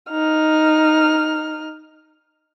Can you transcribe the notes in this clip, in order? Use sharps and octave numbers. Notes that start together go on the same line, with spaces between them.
D#4 F6